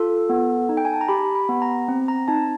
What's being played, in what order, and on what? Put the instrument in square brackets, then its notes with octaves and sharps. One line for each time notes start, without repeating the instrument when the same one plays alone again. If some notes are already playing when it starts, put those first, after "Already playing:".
Already playing: [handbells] F4 A4
B3
D#4
G5
G#5
A5
A#5
G4 B5
B5
B3
A#5
C4
A#5
D#4 A5